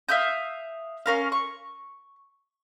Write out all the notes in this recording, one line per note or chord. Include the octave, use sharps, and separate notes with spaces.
E5 F5 D#6 G6
C#4 A#4 F5
C#6